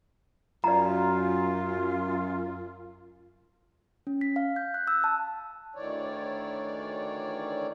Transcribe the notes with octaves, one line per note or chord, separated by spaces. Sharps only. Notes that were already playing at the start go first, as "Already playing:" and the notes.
F#2 F4 D5 A#5
C#4
B6
F5
G6
F#6
E6
A5
D2 D#3 E3 C#5 D5